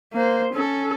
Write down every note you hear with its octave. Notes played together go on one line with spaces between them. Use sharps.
A#3 C5
C#4 A4